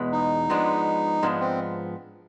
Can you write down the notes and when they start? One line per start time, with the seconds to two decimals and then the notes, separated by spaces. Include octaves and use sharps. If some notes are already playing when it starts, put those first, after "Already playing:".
Already playing: E2 B2 G#3 B3
0.12 D#4
0.50 G#2 F3 G#3 B3 D4
1.23 G#2 F3 G#3 B3 D4
1.41 C4